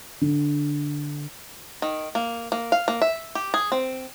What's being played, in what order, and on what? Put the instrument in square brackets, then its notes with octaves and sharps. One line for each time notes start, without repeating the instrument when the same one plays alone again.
[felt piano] D3
[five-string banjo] D#3
A#3
A#3
F5
A#3
E5
G4
G#4
C4